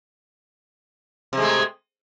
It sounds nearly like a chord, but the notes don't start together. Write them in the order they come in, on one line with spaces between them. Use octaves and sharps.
C3 G#3 A3